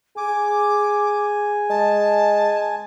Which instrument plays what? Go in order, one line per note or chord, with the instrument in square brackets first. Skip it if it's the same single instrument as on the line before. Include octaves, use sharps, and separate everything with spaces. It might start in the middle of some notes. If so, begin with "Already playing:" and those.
[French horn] G#4 [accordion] G#5 [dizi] D6
[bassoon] G#3 [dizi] A5